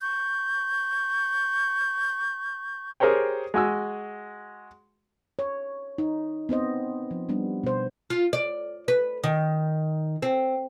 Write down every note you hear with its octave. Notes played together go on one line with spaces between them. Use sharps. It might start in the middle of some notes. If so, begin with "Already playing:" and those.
C#6 G6
G4 G#4 A#4 C5 C#5 G5
G#3 F#4 G#5 E6
C#5
D#4
B3 C4 C5 D#5
F3
G3 B3 D4
B2 C5
F4
D5
B4
D#3
C4